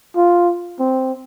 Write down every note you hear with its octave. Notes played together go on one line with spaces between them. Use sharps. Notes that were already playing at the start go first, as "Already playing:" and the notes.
F4
C4